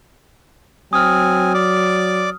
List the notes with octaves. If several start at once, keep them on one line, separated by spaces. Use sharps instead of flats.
F#3 C4 G#5 D#6 F6
D5 D6